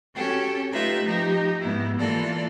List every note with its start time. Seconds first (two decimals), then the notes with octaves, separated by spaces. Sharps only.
0.15 C#4 F#4 G4 A4
0.73 A3 D#4 F4 G4 B4 E5
1.03 F3 A3 D#4 G4
1.59 G#2 B3 E4
1.99 E3 A#3 F4 A4 D5